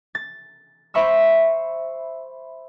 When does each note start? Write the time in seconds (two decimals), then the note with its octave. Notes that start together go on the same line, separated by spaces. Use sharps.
0.15 A6
0.94 C5 E5 B5 C#6 E6